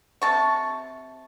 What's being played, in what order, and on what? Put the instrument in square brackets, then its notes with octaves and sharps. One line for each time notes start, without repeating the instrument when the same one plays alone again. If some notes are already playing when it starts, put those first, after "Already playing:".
[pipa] C3 A5 C#6